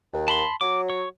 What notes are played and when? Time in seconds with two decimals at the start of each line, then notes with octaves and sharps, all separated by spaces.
0.12 D#2
0.28 A5 B5 C6
0.61 F#3 D6
0.90 C#5